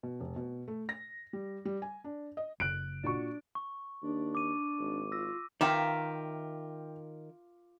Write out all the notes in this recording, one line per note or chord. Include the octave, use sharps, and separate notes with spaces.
B2
F1
B2
A3
A#6
G3
G3
G#5
D4
D#5
F#1 F#6 D7
A#2 D4 F#4 C#6
C#6
D#2 D4
D6 D#7
G#1
F4 E6 A#6
D#3 F4 A#4 E5 G5 D6